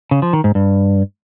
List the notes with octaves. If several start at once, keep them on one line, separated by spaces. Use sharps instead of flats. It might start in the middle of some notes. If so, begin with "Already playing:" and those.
C#3
F3
D#3
G#2
G2